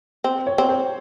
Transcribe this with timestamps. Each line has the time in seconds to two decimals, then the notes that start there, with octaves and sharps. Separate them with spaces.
0.24 C4
0.47 C#5
0.58 C4
0.69 C5